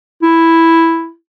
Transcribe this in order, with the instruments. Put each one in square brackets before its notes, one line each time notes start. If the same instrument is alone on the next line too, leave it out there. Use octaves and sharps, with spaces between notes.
[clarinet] E4